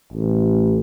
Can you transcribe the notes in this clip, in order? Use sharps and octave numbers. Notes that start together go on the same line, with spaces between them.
A1